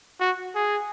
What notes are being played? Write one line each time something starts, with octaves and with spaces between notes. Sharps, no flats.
F#4
G#4